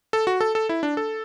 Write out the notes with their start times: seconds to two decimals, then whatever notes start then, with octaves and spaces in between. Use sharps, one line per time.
0.13 A4
0.27 F#4
0.41 A4
0.55 A4
0.69 E4
0.83 D4
0.97 A4